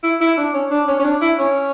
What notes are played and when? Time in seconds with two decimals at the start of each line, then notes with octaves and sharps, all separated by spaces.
0.03 E4
0.21 E4
0.37 D4
0.54 C#4
0.71 D4
0.88 C#4
0.99 C#4
1.04 D4
1.21 E4
1.38 C#4